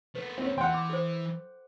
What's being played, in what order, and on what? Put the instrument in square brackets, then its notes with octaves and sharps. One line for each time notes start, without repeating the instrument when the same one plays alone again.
[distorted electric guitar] A3 B3 [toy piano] B4
[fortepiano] C4 C#4
[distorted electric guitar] E3 [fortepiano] F#5 G5 [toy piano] C6
[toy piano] D6
A4 C5